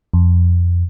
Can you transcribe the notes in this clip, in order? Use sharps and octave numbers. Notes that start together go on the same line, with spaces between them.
F2